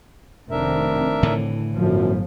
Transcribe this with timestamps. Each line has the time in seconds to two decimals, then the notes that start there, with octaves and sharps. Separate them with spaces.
0.51 F1 D#3 C4 D4 A#4 E5
1.23 A2 D3 E3
1.74 G1 F#2 F3